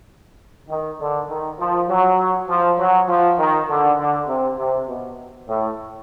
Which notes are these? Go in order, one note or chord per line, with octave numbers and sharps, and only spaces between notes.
D#3
D3
D#3
F3
F#3
F3
F#3
F3
D#3
D3
D3
C3
C3
B2
A2